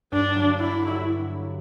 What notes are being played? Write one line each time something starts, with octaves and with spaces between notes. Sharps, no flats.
G2 D4
D3 F#3
G2 E4
D3 F#3